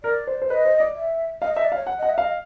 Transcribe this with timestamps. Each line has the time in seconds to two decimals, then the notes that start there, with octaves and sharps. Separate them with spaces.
0.03 A#4 D5
0.27 C5
0.42 C5
0.50 B4 D#5
0.65 C5
0.80 D5
0.95 E5
1.41 D#5 F5
1.53 D#5
1.56 E5
1.64 D5
1.72 F5
1.76 C#5
1.87 F#5
1.99 D#5
2.02 F#5
2.10 E5
2.18 D#5 F5